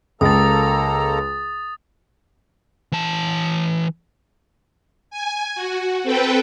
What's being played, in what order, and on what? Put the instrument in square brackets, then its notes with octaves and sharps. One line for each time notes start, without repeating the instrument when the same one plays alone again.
[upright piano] C#2 [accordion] A#3 A4 A#5 [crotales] D#6 A6
[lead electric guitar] E3 A5
[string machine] G#5
F#4
C4 A4 B4 G5